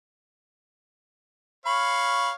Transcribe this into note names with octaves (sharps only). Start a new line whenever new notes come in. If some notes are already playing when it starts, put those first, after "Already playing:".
C#5 F5 B5